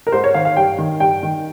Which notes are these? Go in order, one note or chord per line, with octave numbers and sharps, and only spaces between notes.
A#4
G#2 C5
C#5
D#3 F5
F5
G2 G5
D#3
G2 G5
D#3